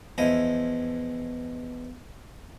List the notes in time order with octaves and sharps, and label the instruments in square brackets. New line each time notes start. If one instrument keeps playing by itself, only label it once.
[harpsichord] E2 F3 E4 D#5 D#6